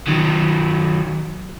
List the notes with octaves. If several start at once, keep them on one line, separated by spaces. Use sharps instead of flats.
D#3 F#3